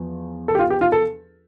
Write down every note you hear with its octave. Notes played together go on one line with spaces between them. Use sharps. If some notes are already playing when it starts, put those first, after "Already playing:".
Already playing: E2 F3
A4
G4
F4
G4
F4
A4